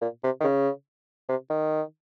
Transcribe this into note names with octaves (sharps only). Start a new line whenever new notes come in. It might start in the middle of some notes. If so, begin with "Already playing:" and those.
A#2
C3
D#3
C#3
C3
D#3